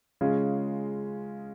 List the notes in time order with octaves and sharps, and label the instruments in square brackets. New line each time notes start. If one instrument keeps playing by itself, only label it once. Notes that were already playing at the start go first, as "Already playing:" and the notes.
[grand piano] C#3 G#3 C#4 F4